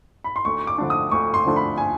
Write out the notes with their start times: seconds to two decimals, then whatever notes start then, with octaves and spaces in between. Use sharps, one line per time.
0.24 B5
0.36 C6
0.45 D2 C#6
0.67 D6
0.78 D3 F3 A3 D4
0.90 D#6
1.11 D2 C#6
1.34 C6
1.45 D3 F3 A3 D4
1.56 B5
1.78 G#5